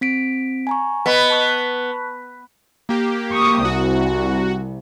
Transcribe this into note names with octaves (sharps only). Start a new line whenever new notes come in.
C4 B6 D7
G#5 A#5 C#6
B3 B4 D#5 B5
A5 C#6 F#6
A#3 G4
C#6 D#6
C2 F#4